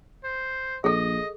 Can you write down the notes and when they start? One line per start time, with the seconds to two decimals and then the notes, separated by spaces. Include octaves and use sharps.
0.24 C5
0.84 A#1 G#4 A4 D#5